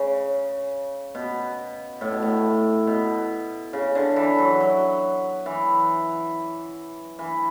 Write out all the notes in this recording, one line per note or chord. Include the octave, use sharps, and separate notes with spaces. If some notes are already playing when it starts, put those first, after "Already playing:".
Already playing: C#3
B2
A2
B2
A2
B2
C#3
D3
E3
F#3
F#3
E3
E3